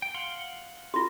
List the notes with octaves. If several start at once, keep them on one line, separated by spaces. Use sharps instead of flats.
G5
F5 F#5 C6
F4 F#4